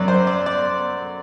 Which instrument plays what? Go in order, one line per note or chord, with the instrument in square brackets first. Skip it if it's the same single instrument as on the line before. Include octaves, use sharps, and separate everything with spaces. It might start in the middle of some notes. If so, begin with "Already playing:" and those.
Already playing: [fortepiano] F#2 F#3 D5
C5
D5
D5